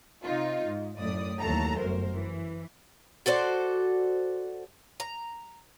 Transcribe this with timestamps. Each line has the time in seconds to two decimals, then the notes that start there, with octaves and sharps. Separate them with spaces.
0.25 C3 D#4 F4
0.65 G#2
0.99 F#2 A2 D5 D#6
1.40 D#2 E3 F#3 A3 A5 A#5
1.78 G1 F#2 A#4 C5
2.14 E3
3.26 F#4 A4 C5 D5
5.00 A#5